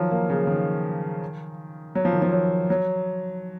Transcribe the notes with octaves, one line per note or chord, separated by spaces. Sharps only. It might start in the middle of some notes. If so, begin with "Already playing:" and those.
Already playing: D#3 F3 F#3
A#3
C#3
D#3
F#3
F3
D#3
F3
F#3
F#3